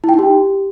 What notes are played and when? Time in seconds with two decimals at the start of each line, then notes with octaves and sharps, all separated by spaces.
0.04 E4
0.09 G5
0.14 D#4
0.19 G4